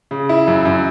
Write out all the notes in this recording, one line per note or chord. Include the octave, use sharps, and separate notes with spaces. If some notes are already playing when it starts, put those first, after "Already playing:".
C#3
E4
F#2
F#2